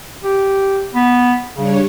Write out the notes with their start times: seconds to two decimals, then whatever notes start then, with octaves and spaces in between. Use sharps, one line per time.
0.23 G4
0.95 B3
1.56 C#3 G3 D4 C#5